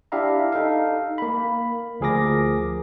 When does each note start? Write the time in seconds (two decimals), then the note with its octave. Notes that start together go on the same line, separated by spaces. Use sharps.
0.12 D4 E4 G4 E5 F5 A#5
0.52 D#4 A4 F5
1.18 A#3 B5
2.00 D2 F3 G#4 A#4 D6 A#6